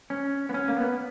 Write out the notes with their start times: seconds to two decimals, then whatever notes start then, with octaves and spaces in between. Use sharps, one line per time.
0.10 C#4
0.49 B3
0.54 C#4
0.68 A#3
0.77 B3